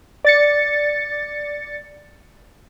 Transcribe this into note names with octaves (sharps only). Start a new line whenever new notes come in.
D5 A6 C#7